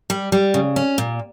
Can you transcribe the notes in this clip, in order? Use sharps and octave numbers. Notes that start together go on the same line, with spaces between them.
G3
G3
C#3
C#4
A#2